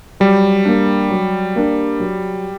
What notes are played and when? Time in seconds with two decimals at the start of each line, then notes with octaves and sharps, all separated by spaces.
0.20 F#3 G3
0.65 A#3 D4
1.10 F#3
1.56 A#3 D4
2.00 F#3